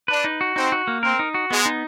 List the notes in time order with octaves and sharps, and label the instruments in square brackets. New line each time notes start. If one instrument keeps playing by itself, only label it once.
[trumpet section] D4 [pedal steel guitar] B4
[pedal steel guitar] D#4
F#4
[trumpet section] C4 [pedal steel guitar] D#4
[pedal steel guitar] F#4
A#3
[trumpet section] C4 [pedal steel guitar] A#4
[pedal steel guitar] D#4
F#4
[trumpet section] G#3 [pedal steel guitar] B3
[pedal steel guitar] D#4